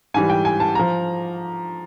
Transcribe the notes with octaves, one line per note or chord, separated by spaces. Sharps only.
G#2 E3 G3 G#5
G5
G#5
A5
F3 A#5